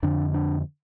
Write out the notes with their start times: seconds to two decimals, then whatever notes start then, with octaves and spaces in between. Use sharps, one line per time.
0.03 F2 D3 D4
0.34 D4